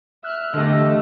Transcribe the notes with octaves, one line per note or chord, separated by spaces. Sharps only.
E5 F6 F#6
E2 D3 A3 G4 A4 D#5